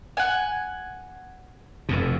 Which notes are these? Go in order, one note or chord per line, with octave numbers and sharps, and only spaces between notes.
F#5 G#5
F1 F2 B2